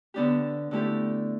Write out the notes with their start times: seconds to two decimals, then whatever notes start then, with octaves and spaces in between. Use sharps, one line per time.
0.14 D3 B3 D4 G4
0.71 D3 A3 E4 G4